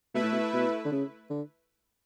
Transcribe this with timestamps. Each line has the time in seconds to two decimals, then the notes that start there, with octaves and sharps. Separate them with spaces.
0.14 B2 A3 E4 B4 E5
0.23 A2
0.32 B2
0.54 B2
0.85 D3
0.92 C#3
1.30 D3